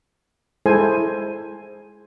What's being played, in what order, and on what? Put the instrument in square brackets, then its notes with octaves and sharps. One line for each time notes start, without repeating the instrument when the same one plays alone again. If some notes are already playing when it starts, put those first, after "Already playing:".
[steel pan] G#3 E4 A4 C5 G#5